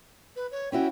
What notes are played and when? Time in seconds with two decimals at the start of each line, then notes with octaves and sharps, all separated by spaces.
0.36 B4
0.51 C#5
0.72 C#4 E4 F#4 G5